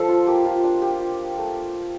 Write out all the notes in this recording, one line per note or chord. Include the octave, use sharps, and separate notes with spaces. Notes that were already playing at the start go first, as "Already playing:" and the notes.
Already playing: F3 A4 C5
F4
A#3 G4
F4
D4
G4
F4
A3